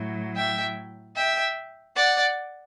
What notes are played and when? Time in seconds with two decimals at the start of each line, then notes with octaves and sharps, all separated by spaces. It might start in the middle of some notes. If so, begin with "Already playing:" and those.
Already playing: A2 F#3
0.36 E5 G5
1.16 E5 G5
1.96 D5 F#5